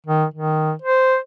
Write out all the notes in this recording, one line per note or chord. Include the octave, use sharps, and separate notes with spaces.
D#3
D#3
C5